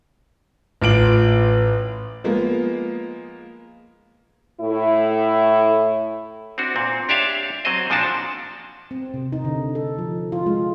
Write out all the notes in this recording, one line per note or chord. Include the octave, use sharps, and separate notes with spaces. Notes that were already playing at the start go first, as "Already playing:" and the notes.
A1 F4 D7 F#7
F3 G#3 A#3 B3
A2 E4
C4 D4 F#4
A#2 C4
D4 G4 C#5 D5 E5 F5
F#3 C4 C5 D#5
A#2 F3 D4 F#4 A5
C4
C3
D#4
D3
A4
F3
F4
G#3